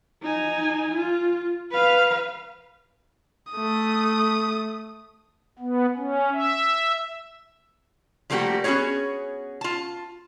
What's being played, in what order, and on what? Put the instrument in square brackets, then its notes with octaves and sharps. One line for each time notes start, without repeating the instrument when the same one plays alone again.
[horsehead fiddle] D#4 G#5
F4
B4 F5
[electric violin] A3 D#6
[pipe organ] B3
C#4
E5
[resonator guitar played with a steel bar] F3 G3 A3 A#3 F#4 G4
B3 C#4 D#4 F#4 G#4 C#5
F4 A5